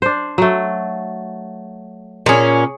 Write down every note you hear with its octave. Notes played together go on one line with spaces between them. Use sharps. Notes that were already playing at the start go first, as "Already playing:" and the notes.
D4 C5
F#3 A3
A#2 C#4 G#4 C#5